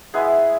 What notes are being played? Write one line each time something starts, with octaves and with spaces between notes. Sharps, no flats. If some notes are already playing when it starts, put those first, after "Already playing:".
G#3 B3 E4 G#4